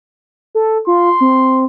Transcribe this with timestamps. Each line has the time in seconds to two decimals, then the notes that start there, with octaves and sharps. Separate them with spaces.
0.55 A4
0.87 F4 C6
1.21 C4